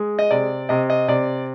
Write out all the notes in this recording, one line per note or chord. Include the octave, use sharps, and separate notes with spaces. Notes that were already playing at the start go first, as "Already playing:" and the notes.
Already playing: G#3
D#5
C3 D5
C3 D#5
D#5
C3 D5